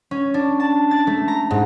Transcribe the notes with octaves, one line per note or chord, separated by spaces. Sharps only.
C#4
D4
A5
A6
A3
A#5
G#2